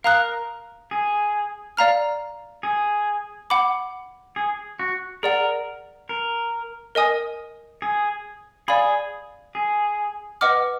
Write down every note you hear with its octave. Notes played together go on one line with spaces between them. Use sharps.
A#4 F5 A#5 D#6 F#6
G#4
D5 F5 A#5 F6
G#4
F#5 B5 D6
G#4
F#4
G#4 A#4 D5 F#5
A#4
A#4 D#5 G#5 D#6
G#4
G#4 D5 F5 B5
G#4
B4 D#5 F#5 D6 F6